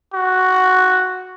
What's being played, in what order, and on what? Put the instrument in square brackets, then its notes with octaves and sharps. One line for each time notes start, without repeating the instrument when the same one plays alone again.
[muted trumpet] F#4